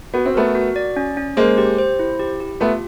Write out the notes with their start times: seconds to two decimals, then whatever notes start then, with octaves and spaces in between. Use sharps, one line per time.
0.14 B3 F#4
0.25 C4
0.34 A3 B3 A#4
0.55 F#4
0.76 D5
0.96 C#4
1.17 C#4
1.37 G#3 A#3 C5
1.58 G4
1.78 C5
1.99 E4
2.20 G4
2.40 G4
2.60 A3 B3 F4